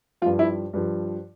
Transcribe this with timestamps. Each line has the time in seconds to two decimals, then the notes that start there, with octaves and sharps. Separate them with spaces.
0.22 F3 F4
0.26 G2
0.39 E4
0.73 G2 F3